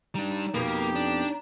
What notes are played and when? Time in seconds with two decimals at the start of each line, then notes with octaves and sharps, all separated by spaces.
0.15 G3 D4 D#4
0.54 F2 B2 A#3 G4
0.96 D4